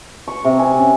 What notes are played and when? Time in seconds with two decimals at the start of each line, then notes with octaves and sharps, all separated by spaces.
0.28 C#6
0.45 C3
0.59 G#5
0.79 C#4